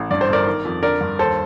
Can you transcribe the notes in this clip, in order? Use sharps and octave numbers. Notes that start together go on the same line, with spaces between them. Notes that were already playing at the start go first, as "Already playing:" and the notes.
Already playing: A1
G2 D5
C5
G1 A#4 D5
D#3
F2
D3 A#4 D5
G2
D#2 A4 C5